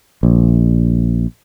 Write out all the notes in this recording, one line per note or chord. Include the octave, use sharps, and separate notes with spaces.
A#1